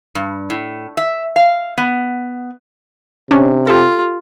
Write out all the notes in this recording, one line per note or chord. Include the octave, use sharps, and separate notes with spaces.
G2
A2
E5
F5
B3
C3 C#4 D4
F4 G4 A4